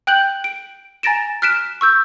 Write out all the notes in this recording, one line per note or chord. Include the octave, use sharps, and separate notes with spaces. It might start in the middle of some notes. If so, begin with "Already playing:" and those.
G5 F#6 G6 F#7
D7
G#5 A#5 A6 A#6 D7 E7
F6 F#6 B6 D7 E7
C#6 E6 G6